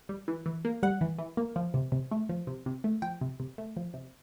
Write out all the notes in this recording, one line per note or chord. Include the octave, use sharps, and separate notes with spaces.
G3
E3
E3
A#3
G3 F#5
E3
E3
A#3
F3
C3
C3
A3
F3
C3
C3
A3
F3 G5
C3
C3
A3
F3
C3